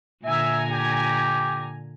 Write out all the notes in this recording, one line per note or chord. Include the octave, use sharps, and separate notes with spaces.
A#2 D3 E5 G#5 A#5
G4